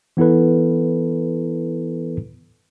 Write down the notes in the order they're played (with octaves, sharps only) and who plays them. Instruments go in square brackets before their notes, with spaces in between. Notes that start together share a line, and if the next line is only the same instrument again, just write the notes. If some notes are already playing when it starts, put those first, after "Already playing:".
[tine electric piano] E3 B3 E4 A4 B4